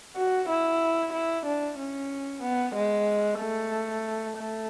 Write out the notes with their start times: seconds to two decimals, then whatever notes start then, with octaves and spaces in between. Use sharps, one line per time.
0.16 F#4
0.49 E4
1.13 E4
1.46 D4
1.79 C#4
2.43 B3
2.75 G#3
3.40 A3
4.37 A3